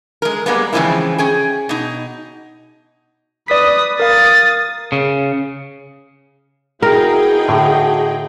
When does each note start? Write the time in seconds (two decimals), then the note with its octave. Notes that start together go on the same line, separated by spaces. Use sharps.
0.22 G#3 A#4
0.46 G3 G#3 A#3 B3
0.72 C#3 E3 F3 G#3 C4 E4
1.18 C#4 G#4 G5
1.69 B2 D#4
3.48 B4 D5 D#6 B6
4.00 A#4 F5 D#6 A6
4.92 C#3
6.82 B3 D#4 E4 F#4 G#4 A#4 G5
7.48 A2 D3 F#4